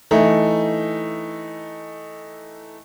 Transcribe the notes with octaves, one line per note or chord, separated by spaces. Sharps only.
E3 A3 D#4